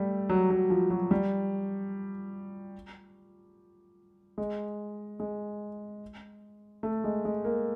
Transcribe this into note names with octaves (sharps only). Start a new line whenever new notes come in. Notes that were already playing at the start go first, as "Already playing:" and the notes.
Already playing: G3 A3
F#3
F#3
F3
F#3
G3
G#3
G#3
A3
G#3
G#3
A#3